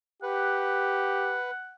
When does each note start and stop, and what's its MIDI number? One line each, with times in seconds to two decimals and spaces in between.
0.23 1.39 67
0.23 1.51 71
0.23 1.76 78